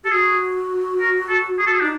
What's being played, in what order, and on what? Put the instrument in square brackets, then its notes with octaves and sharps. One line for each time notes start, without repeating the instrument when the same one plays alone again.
[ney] G4 [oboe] A4
[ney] F#4 [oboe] G#4
[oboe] A#4
A4
G#4
A4
G#4
[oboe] D4 [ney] D#4